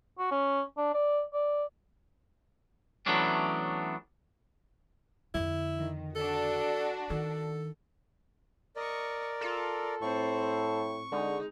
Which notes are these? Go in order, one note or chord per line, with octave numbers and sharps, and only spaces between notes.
F#4
C#4
D4
D5
D5
E3 F#3 A3 B3 C#4 D4
F2 D3 E4
D#3
D4 F#4 A4
D#3 A4
A#4 D5 D#5 C#6
F4 A4
A2 C4 C5 C#6
D3 G#3 D#4